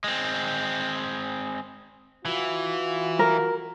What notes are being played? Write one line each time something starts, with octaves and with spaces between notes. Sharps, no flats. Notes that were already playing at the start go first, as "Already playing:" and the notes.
G#3 C4
E3 F4 F#4
A#4